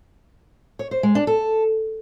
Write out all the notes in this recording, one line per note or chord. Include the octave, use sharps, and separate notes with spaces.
C#5
C5
G#3
D4
A4